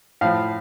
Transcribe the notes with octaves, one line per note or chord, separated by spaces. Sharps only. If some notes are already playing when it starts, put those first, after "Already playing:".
A2 F3 F5